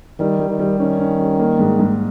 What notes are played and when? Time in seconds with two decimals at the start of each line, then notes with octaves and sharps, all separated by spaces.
0.19 D#3 G3
0.39 G3
0.49 D#3
0.59 G3
0.79 D#3 C#4
0.99 C#4
1.20 G3
1.39 A#3
1.59 G#2
1.79 G#2